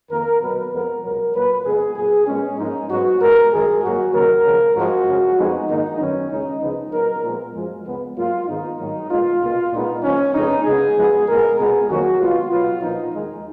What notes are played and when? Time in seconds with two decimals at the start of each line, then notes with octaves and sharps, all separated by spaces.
0.10 F2 D#3 A#3 A#4
0.40 B2 F#3 B3 B4
0.71 F2 F3 G#3 B3 A#4
1.02 C#2 B2 F#3 A#4
1.34 A#2 F#3 A#3 B4
1.65 F2 C#3 G#3 B3 G#4
1.96 A#2 F#3 B3 G#4
2.27 A#2 G#3 B3 C#4
2.58 G#2 F3 A#3 D#4
2.89 G#2 F#3 B3 F#4
3.20 A#2 G#3 B3 A#4
3.51 F#2 D#3 G#3 G#4
3.82 G#2 F#3 A#3 F#4
4.13 D#2 C#3 F#3 A#3 A#4
4.44 C#2 C#3 F3
4.75 G#2 F3 G#3 F#4
5.06 F#2 C#3 G#3
5.37 F2 F3 G#3 B3 D#4
5.68 G#2 D#3 A#3 D#4
5.99 F#2 D#3 F#3 B3 C#4
6.30 C#2 C#3 G#3 D#4
6.61 C#2 C#3 F3 G#3 B3 D#4
6.92 A#2 F#3 B3 A#4
7.23 A#2 F3 G#3 B3
7.54 F#2 F3 G#3
7.85 C#2 C#3 G#3 B3
8.16 G#2 F#3 A#3 F4
8.47 G#2 D#3 G#3 B3 D#4
8.78 G#2 D#3 F#3 A#3
9.09 A#2 G#3 B3 F4
9.40 C#2 B2 A#3
9.71 A#2 G#3 B3 D#4
10.02 C#2 C#3 F3 A#3 C#4
10.34 F2 C#3 G#3 B3 D#4
10.64 C#2 C#3 G#3 B3 G#4
10.96 F#2 F3 G#3 B3
11.27 A#2 G#3 B3 A#4
11.58 C#2 B2 G#3 B3 G#4
11.89 F2 D#3 F#3 A#3 F#4
12.20 B2 G#3 B3 F4
12.51 C#2 B2 F#3 B3 F4
12.81 A#2 F3 B3 D#4
13.12 D#2 D#3 G#3 D#4